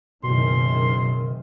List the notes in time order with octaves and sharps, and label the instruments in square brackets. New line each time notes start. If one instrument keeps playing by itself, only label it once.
[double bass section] F#1 D#3 [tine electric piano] B2 [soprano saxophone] C6